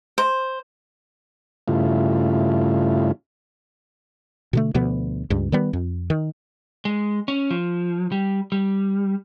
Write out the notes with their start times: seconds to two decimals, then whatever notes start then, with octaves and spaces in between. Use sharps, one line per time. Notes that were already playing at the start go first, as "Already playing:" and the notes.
0.18 C5
1.68 G2 C#3 A3 E4 F4
4.53 B2 D3 A3
4.75 D2 B2 F3 B3
5.30 C#2 G2
5.52 D#3 G3 B3
5.73 F2
6.10 D#3
6.85 G#3
7.28 C#4
7.50 F3
8.12 G3
8.52 G3